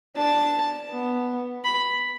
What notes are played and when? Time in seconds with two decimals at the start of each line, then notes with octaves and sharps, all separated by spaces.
0.16 D4 A5
0.91 B3
1.65 B5